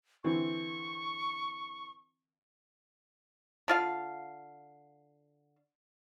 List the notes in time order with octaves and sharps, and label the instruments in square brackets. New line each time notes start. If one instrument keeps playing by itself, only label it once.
[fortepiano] D3 E3 C4 [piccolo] C#6
[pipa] D3 F4 F5